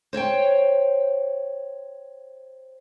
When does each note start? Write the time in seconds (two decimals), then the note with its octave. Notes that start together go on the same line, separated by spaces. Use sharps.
0.13 C5 C#5 E5 G5